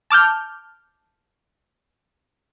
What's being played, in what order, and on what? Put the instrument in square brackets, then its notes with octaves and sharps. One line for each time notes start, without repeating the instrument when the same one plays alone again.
[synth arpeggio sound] A5 D6 F6 G6